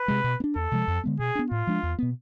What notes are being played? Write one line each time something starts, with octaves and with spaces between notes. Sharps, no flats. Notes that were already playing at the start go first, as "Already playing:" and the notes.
Already playing: B4
C3 G#3
B2
B3
D4
E2 A4
C3 F3 G#3
F2
D3 G#3 B3
B2 G#4
B3 D4
A2 F4
F3 G#3 D4
E2
B2 B3